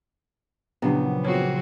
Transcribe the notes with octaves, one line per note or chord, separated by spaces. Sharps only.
F#1 A#2 F3 B3 C#4 D4 G4
A#3 C4 F4 F#4 G#4 C#5